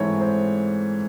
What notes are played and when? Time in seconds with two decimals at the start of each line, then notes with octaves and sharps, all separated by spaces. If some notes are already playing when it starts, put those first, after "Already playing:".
Already playing: G#2 E3 A3 C4 C#5
0.21 C5